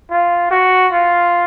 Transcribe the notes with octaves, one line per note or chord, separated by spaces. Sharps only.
F4
F#4
F4